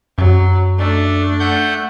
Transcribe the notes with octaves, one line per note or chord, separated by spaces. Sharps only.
F#2 F#3
A3 D4
A3 F#5 G6